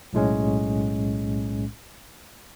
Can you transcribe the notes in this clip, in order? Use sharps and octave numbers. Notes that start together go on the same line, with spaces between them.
B1 A2 G#3 C#4